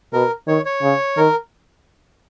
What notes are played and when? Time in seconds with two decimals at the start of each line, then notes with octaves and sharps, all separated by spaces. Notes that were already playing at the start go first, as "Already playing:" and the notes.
0.13 B2 A#4
0.47 D#3 C#5
0.65 C#5
0.82 C#3
1.17 D#3 A#4